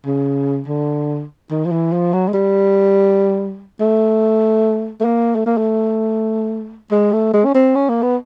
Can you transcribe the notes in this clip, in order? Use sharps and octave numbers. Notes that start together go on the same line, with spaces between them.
C#3
D3
D#3
F3
E3
F3
F#3
G#3
G3
A3
A3
A#3
A3
A#3
A3
G#3
A3
G#3
C#4
C4
C#4
A#3
B3